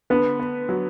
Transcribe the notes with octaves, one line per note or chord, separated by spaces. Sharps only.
D3 B3 B4
B3
F#3